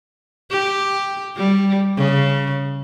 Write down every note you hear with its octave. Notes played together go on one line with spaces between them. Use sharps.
G4
G3
C#3